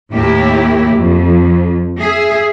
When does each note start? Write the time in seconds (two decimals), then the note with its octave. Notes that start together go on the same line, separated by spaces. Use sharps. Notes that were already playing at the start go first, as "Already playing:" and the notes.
0.12 D#2 A2 A#3 E4 G4
0.93 F2
2.00 G#4 E5